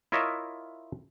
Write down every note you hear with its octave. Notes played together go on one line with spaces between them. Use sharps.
E4 F4 A#4 C#5 D#5 E5